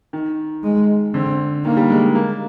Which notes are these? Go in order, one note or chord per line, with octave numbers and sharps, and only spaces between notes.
D#3
G#3
D3 C4
D#3 A#3
G3
G#3
A#3